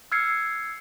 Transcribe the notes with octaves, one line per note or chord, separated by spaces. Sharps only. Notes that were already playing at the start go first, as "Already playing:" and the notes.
E6 F6 G#6 C7 C#7